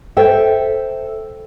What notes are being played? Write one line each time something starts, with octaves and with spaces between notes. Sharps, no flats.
A4 C5 E5 G5